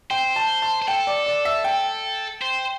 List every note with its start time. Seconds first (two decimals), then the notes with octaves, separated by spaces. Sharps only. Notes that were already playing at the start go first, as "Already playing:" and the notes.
0.10 C5 G5
0.36 A5
0.62 A5
0.82 C5
0.88 A4 G5
1.07 D5
1.26 D5
1.45 E5
1.64 G5
2.42 C5